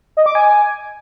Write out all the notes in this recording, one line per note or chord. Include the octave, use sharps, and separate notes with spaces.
D#5
D6
G#5